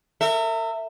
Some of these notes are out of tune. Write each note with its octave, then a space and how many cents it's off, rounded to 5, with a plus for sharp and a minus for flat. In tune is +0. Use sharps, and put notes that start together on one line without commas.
A#4 -40 E5 +0